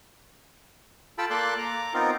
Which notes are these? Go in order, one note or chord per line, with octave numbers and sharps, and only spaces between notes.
F4 A4 G5 A5 B5 E6
A#3 A4 D5 C6 D6 F#6
A#5 D6
B3 C4 D#4 F4 A#4